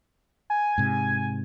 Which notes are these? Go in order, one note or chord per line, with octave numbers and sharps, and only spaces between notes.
G#5
G#2 C3